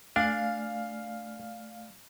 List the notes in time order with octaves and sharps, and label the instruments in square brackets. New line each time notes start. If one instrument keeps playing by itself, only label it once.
[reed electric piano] A3 D5 G#5 [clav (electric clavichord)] D4 [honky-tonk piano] F5